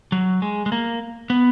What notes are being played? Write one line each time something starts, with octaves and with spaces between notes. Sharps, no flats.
F#3
G#3
G#3
A#3
B3